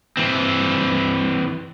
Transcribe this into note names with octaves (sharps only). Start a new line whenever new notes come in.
E3 C4